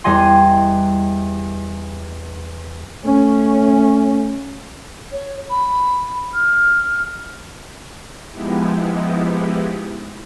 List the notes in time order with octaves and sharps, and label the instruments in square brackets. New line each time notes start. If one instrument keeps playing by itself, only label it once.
[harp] E2 G3 D#5 G#5 C6
[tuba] A3 [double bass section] C#4
[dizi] C#5
B5
F6
[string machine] F3 G#3 B3 D#4 E4 G4